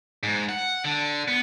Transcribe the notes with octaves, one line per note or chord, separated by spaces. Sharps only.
G#2
F#5
D3
B3